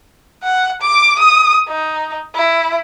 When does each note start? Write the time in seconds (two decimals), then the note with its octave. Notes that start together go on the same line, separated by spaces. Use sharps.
0.43 F#5
0.81 D6
1.19 D#6
1.68 D#4
2.35 E4